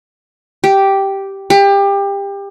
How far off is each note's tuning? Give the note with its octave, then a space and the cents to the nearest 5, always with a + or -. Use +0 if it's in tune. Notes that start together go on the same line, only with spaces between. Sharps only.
G4 -5
G4 +25